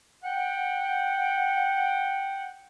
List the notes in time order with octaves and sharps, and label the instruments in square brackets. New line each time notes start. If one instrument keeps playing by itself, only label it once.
[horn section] F#5 G5